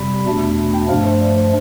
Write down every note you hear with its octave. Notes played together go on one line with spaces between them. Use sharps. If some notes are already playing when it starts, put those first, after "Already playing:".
Already playing: F2 C3 G3 B5
E2 B2 A3 D4
G5
G2 F3 A3 D4 F5
C5
D5
C5